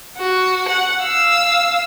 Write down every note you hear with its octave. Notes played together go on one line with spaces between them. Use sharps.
F#4
F#5
F5 E6